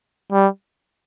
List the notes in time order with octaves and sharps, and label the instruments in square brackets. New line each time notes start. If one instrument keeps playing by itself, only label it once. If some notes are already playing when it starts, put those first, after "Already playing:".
[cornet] G3